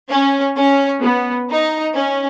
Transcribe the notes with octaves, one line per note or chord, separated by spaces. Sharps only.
C#4
C#4
B3
D#4
C#4